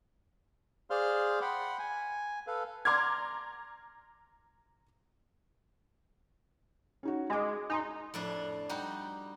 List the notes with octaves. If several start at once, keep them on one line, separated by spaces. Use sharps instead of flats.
G#4 C5 D5 F5 C6 F6
F#5 G5 B5 C6
G#5
A4 B4 F5
A#5 C6 D6 F6 G#6
C#4 D#4 F#4
G#3 G#4 D6
D#4 G#5 A#5 C6
F2 A2 D4
G3 D#4 F#4 G4